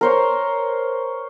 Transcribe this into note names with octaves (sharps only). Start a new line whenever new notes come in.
A#4 C5 C#5